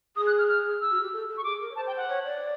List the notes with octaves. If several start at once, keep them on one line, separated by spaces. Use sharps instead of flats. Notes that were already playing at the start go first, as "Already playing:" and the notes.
G#4 D#6
F#6
F6
F6
E6
F#4
G4
A4
A4
C#6
G#4 D6
A#4
C#5
C5 A5
G5
F#5
C#5
D5